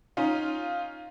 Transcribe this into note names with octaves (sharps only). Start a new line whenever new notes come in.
C#4 D#4 F4